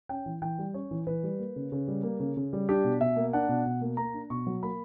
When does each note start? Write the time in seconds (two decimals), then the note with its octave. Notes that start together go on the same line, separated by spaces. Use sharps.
0.09 C#4 G5
0.26 E3
0.42 E3 G5
0.59 G3
0.74 C#4 C#5
0.91 E3
1.07 E3 B4
1.23 G3
1.39 A#3
1.56 C#3
1.72 C#3
1.88 G3
2.03 A#3
2.20 C#3
2.37 C#3
2.53 G3
2.69 D4 G4
2.84 B2
3.01 B2 E5
3.16 A#3
3.33 D4 F#5
3.49 B2
3.66 B2
3.81 A#3
3.97 A#3 A#5
4.14 D4
4.30 B2 C#6
4.47 F#3
4.63 A#3 B5